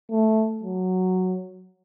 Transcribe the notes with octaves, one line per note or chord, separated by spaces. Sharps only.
A3
F#3